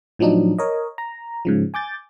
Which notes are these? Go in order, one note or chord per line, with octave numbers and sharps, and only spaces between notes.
A2 F3 F#3 D4 D#4
A#4 C#5 D#5
A#5
G#2 C#3 F3
G#5 D6 G6 A6